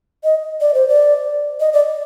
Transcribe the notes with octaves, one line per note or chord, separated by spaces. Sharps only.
D#5
D5
C5
D5
D#5
D5